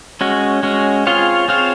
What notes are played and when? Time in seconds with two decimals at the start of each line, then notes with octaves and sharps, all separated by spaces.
0.21 G#3 C#4 F#4
0.63 G#3 C#4 F#4
1.07 C4 F4 G#4 C#5 F5
1.48 C4 F4 G#4 C#5 F5